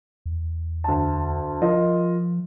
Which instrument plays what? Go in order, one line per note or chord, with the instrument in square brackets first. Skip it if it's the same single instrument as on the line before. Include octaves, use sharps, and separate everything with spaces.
[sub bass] E2
[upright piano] D2 A5
[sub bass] F3 [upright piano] F4 A#4 D#5